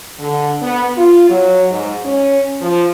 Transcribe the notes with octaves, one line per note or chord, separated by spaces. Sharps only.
D3
B3
F4
F#3
G#2
C#4
F3